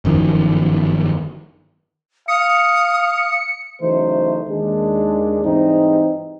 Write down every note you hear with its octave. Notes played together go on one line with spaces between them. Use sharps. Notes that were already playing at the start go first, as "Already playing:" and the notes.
G1 F#2 D#3 F3
F5 D#6 C#7
C#3 E3 F#3 A3 D#4 C5
D#2 G#3 D4
G#2 E3 G3 C4 D#4